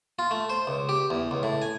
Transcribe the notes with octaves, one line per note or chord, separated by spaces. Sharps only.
F4
A3
C5
C#2
G4
E2
C#2
A2
G#5